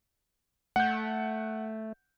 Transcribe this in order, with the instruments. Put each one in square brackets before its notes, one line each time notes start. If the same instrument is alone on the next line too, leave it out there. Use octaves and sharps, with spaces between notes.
[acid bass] A3 [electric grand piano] F#5 G6